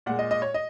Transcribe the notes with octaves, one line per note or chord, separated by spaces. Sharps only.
A#2 G#3 F#5
D#5
D#5
C#5
D#5